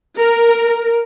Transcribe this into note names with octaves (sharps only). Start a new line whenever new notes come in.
A#4